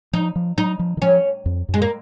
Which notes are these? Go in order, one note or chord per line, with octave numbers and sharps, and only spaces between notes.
F3 D#4
F3
F#3 D#4
F3
D#3
F3 C#4
F2
F#2
G#3
A#3